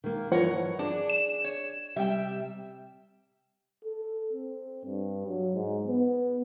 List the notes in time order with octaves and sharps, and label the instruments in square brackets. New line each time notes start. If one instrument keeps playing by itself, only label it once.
[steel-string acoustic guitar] D#3 A#3
[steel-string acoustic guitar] G2 E3 [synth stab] F3 [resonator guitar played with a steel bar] A#4 C#5 F#5
[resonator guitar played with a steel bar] D4 [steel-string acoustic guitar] G#4
[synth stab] E7
[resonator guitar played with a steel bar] C#5
[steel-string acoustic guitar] C3 G3 [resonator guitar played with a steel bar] E5 G5
[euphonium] A4
C4
G2
F#3
G#2
B3